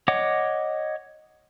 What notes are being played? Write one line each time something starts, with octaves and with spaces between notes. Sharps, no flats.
C#5 D#5 F#5 D6